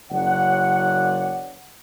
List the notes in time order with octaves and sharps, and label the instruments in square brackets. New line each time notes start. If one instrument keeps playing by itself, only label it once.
[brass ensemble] F#1 F#2 C#5 D5 F#5